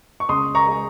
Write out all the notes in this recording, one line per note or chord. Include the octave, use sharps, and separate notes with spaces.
C#6
C#2 C6 D#6
A#5 C#6
G#3